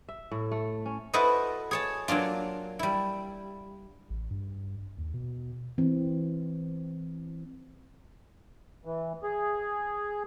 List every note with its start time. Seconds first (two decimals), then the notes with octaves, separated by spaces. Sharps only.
0.09 E5
0.31 A2
0.51 A3
0.86 C#4
1.13 E4 F#4 A4 B4 C5 D#5
1.71 G#4 C#5 A5
2.08 F#3 A#3 D4 F4
2.79 G3 E4
4.10 A1
4.31 G2
4.98 D#2
5.14 B2
5.78 E3 C4
8.85 E3
9.23 G#4